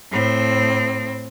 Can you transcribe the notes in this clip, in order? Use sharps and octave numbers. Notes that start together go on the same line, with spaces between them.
A2 C4